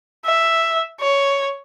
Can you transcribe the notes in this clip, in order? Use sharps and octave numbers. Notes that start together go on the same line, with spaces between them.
E5
C#5